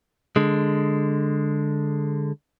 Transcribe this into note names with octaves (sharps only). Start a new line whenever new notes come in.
D3 G#3